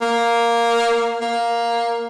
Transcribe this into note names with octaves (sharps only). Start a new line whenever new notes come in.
A#3
A#3